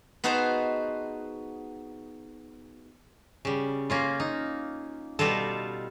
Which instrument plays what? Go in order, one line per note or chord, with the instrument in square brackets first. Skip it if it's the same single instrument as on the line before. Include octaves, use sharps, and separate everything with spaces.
[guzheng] B3 D#4 F#4 G#4 C5 A5
[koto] C#3 G3
A#3 C#4 F4
D#4
B2 G3 D#4 F4 A4